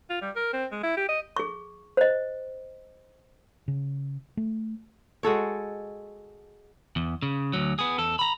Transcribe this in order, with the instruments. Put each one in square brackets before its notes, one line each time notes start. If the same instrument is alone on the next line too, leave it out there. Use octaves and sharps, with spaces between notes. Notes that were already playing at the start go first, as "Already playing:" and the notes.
[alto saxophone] F4
G3
A#4
C4
G#3
E4
G4
D#5
[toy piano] G#4 C#6
C5 D#5
[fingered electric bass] C#3
A3
[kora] G#3 F#4 A4 C#5
[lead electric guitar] E2
C#3
D2 F#3
B3 G#4
E2 A4
A#5 B5